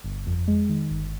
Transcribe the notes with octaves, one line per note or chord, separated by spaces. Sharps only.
G1
F2
G#3
D#3
G1